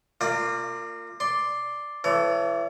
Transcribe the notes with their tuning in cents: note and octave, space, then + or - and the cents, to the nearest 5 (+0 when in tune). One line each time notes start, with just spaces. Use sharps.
A#3 -30 F4 +0 D5 +20
D5 +0 C6 +0
E3 +35 A4 +0 C#5 +40